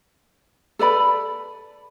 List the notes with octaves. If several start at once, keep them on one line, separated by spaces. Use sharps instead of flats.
A4 B4 D5 B5